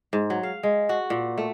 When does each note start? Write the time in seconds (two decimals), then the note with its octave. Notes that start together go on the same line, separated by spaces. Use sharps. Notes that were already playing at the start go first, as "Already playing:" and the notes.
0.13 G#2
0.30 F#3
0.43 F5
0.63 G#3
0.89 F#4
1.10 A#2
1.38 A3